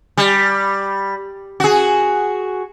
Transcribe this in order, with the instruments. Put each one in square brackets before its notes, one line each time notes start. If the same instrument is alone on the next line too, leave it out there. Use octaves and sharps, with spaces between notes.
[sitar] G3
F#4 G#4